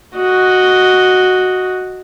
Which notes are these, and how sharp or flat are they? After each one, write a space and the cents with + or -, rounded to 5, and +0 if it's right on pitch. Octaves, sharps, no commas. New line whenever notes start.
F#4 +0 D#5 +0